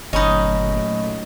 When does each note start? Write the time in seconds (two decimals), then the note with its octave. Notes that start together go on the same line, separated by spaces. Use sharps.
0.13 G1 A#2 F#3 A3 C#4 D#4 D#5 B5